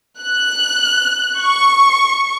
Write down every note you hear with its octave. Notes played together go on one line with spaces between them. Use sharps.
F#6
C#6